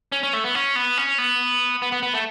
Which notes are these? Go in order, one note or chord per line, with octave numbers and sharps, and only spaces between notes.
C#4
C#4
A3
B3
C#4
B3
C#4
B3
B3
B3
B3
A3